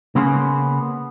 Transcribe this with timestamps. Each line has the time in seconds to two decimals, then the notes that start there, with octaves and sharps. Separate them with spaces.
0.15 C#3 A#3 B3 C#4 G#4 C6